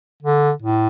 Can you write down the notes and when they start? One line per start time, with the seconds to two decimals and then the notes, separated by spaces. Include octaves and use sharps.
0.22 D3
0.62 A2